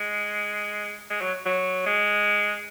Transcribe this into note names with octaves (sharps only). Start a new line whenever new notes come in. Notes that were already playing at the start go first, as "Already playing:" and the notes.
Already playing: G#3
G#3
F#3
F#3
G#3